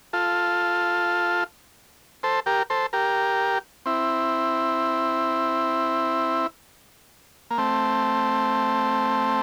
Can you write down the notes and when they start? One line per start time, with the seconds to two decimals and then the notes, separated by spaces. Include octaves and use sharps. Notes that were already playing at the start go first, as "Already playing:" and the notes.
0.13 F4 A4
2.23 A4 C5
2.46 G4 A#4
2.70 A4 C5
2.93 G4 A#4
3.86 C4 E4
7.51 A#3
7.58 A3 C4